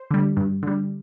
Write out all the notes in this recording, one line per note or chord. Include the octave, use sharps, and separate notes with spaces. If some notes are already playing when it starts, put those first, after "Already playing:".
Already playing: C5
D3 G3
G2
D3 G3